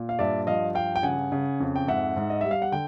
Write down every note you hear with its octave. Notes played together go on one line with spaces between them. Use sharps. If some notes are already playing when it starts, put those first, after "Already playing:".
Already playing: A#2
F5
G2 D5 E5
F3 D#5 F5
G2 F5 G5
G5
C#3 F#5 G#5
C#3
F2
G5
G#2 E5 F#5
G#2
D#5
G3 E5
F5
F#5
D3 G5